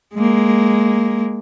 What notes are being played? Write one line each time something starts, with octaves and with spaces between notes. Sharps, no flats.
G#3 A#3